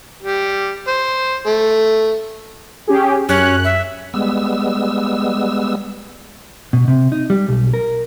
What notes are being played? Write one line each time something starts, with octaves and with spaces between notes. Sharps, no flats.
G3
C5
A3
C#4 G4 G#4
F#2 C#4 F#6
E5
G3 G#3 B3 E6
B2
C3
D#4
G3
B1
A#4